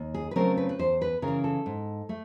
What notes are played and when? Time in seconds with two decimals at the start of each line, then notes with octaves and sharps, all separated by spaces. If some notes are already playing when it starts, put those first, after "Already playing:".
Already playing: D#2
0.14 G#4
0.31 B4
0.35 C#3 F#3 A3 C4 A#4
0.57 B4
0.69 B4
0.79 E2 C5
1.02 B4
1.22 C#3 A#4
1.28 E3
1.44 A4
1.66 G#2
2.09 A3